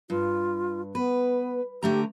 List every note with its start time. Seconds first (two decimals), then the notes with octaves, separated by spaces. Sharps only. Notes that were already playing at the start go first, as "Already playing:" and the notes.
0.10 G2 F4
0.95 B3 B4
1.82 D3 A3 G4 A#5